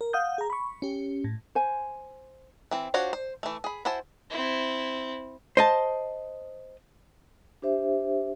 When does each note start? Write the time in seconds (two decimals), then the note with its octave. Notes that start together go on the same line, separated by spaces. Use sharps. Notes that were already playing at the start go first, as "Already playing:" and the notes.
0.01 A#4
0.13 F5 F#5 D#6 G6
0.38 G#4 A#5
0.50 B5 C#6
0.82 C#4 G4
1.24 A2
1.55 C5 G#5
2.71 E3 C4
2.94 D4 F4 F#4 C5 C#5
3.13 C5
3.43 E3 A3
3.64 G#4 B5
3.85 E4 F#4 C5 G#5 A5
4.31 C4 E4
5.57 C5 D#5 A5
7.62 D4 G4 C5 E5